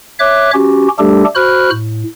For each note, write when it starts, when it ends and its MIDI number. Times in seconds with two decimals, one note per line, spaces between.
0.19 0.51 73
0.19 0.51 76
0.19 0.51 86
0.19 0.51 90
0.54 0.88 61
0.54 0.88 66
0.54 0.88 67
0.99 1.24 55
0.99 1.24 57
0.99 1.24 62
0.99 1.24 67
0.99 1.24 69
1.35 1.70 66
1.35 1.70 72
1.35 1.70 83
1.35 1.70 89
1.35 1.70 90
1.71 2.04 45